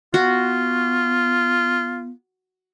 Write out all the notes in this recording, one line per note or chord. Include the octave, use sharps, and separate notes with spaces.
B3 F4 F#4